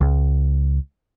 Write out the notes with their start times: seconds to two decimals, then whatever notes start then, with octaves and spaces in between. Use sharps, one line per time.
0.01 C#2